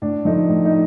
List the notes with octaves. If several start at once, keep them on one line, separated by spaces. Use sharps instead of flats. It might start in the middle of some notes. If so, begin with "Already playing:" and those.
A2 D4
F3 A3 D#4
A2
D#4